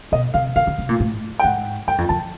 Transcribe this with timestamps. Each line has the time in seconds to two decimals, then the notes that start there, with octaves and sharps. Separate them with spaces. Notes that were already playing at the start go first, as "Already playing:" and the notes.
0.12 B2 D#5
0.34 C3 F5
0.56 C#3 F5
0.67 C#3
0.78 C3
0.89 A#2
1.00 A2
1.39 G5
1.44 G#2 F#5
1.88 G2 G5
1.98 F2
2.09 F2 A5